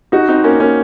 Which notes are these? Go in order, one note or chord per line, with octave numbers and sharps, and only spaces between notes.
D#4 F#4
C4 D#4
A#3 C#4
A#3 C#4